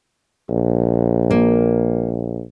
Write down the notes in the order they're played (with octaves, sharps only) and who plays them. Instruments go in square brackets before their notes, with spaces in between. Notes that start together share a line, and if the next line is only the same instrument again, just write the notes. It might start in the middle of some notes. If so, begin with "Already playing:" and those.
[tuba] A#1
[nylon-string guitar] A#3